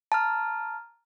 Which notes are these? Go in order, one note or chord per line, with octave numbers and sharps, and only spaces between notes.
A5 A#5 F6